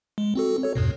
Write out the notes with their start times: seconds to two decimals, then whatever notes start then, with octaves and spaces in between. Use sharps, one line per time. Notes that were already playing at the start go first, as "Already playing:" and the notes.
0.18 G#3
0.35 C4 F#4 A4
0.63 A4 C#5
0.75 E2 G2 B2